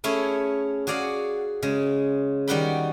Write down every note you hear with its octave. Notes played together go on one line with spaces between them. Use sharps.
A3 C#4 E4 G#4 C#5
F#4 G#4 D5 F5 F#5
C#3 G#3
D#3 G3 F#4 F#5 G5 B5